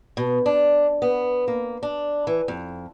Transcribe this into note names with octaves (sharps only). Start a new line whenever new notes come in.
B2
D4
B3
A#3
D4
E3
F2